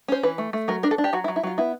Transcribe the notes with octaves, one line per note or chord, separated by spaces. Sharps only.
C#4 C5
E3 B4
A3
A3
F#3 A#4
D4 A#4
A4
D4
G4
F#3 F#4
E4
F#3
E4
F#3 F4
B3 E4